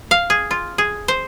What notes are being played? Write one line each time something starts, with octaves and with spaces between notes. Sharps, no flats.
F5
G#4
F4
G#4
C5